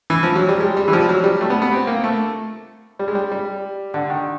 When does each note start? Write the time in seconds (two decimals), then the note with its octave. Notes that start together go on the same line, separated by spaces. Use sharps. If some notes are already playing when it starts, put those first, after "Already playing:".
0.10 E3
0.23 F3
0.36 F#3
0.49 G3
0.60 G#3
0.77 G3
0.88 E3
0.93 F3
1.09 F#3
1.24 G3
1.41 A3
1.50 B3
1.62 B3
1.73 C4
1.87 A#3
2.04 A3
2.99 G3
3.08 G#3
3.15 G3
3.32 G3
3.94 D3
4.10 D#3